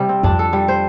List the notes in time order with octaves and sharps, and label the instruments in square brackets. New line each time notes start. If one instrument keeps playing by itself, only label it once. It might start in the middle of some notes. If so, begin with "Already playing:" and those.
Already playing: [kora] C3 G3
C4
[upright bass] F2 [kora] D4
[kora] A4
G3
C5